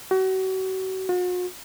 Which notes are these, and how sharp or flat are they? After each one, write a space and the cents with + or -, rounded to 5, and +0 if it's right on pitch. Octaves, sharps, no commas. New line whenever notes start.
F#4 +35
F#4 -45